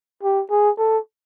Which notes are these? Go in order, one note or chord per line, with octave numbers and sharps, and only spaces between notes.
G4
G#4
A4